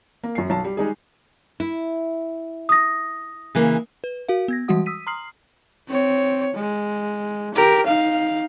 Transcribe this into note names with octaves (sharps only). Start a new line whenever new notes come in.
A#3
F#2 C7
B1 A5
G3
G3 G#3 D#4 G#4
E4
D#6 A#6
C#3 E3 A#3
B4
F#4 A#4 F5
B3 G#6 A#6
E3 G3 G#3 F#4 F#5 D#6
D#6 E6 B6 D#7
A#5 C6 D#6 F6 C7 F#7
C4 C#5
G#3
G4 A#4
D#4 F5